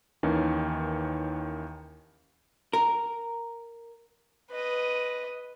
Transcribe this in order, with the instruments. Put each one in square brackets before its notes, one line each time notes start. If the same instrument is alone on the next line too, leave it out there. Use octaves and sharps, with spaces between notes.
[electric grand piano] D#2 D#3 E3 C#4
[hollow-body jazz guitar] A#4
[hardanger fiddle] B4 D#5